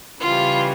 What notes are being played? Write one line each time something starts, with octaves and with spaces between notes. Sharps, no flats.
C#3 E3 G3 F4